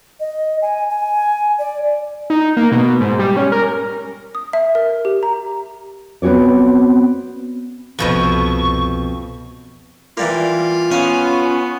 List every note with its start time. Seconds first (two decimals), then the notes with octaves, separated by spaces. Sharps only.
0.20 D#5
0.62 G#5
0.90 G#5
1.59 D5
2.30 D#4
2.57 A#3
2.72 B2
3.00 G#2
3.19 G3
3.37 C#4
3.52 A#4
4.35 D#6
4.53 E5
4.75 A#4
5.05 G4
5.23 A#5
6.22 B3 C4 F#4 C#5 D5
7.99 C2 F2 G#2 B2 F3 C#6
10.17 E3 G3 A#3 F4
10.91 B3 C#4 F5